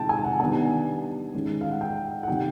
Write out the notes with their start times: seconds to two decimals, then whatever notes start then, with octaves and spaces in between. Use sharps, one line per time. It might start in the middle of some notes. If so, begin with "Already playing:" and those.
Already playing: C3 D#3 G#3 G5 A5
0.09 G#5
0.24 F#5
0.40 D#3 G3 B3 D4 G#5
1.35 D#3 G#3 C#4
1.61 F5
1.71 F#5
1.81 G5
2.23 F#5
2.28 C3 D#3 G3 G5